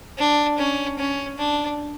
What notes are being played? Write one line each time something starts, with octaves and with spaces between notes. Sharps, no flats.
D4
C#4
C#4
D4